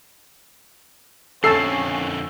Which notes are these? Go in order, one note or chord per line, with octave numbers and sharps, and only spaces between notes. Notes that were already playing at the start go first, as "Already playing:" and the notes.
F2 D3 C#4 A4 A5 E6 C7